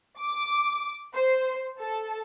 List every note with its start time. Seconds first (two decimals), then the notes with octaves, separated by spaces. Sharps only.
0.19 D6
1.14 C5
1.80 A4